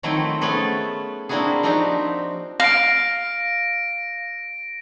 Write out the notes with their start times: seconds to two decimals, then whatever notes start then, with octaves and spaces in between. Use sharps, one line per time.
0.03 D#3 F3 F#3 A3 C4 E4
0.41 A3 B3 C#4 G#4 A4 B4
1.29 A#3 C4 D4 E4 F#4 G#4
1.63 F3 C4 D4 D#4 F#4 G4
2.60 F5 A#6 D7